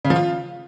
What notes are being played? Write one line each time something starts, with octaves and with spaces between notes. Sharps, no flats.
C#3
F3
F4